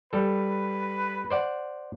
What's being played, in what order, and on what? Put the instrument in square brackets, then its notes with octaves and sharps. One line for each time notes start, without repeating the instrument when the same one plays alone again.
[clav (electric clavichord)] G3 A4 [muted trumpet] B4
[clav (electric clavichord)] C5 D5 F#5